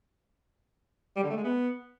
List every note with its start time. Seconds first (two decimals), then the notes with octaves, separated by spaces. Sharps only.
1.16 G3
1.23 D3
1.30 A3
1.37 G#3
1.44 B3